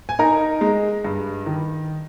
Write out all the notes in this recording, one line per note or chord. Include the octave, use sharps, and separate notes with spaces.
G#5
D#4 A#4 A#5
G#3
G2
D#3